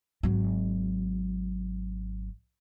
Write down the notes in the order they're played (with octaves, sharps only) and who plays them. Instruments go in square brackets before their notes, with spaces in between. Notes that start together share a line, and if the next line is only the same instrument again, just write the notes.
[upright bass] G#1 F#3